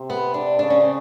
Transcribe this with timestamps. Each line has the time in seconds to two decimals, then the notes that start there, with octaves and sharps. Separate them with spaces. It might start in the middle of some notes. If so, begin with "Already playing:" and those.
Already playing: C3
0.10 B3
0.34 D4
0.59 C#3 D4
0.70 C#4
0.80 C4